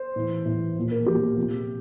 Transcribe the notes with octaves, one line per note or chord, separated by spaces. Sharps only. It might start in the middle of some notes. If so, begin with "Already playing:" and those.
Already playing: C5
A2 E3
A2 E3
A#2 F3
A#4
A#2 F3 G4
C3 F3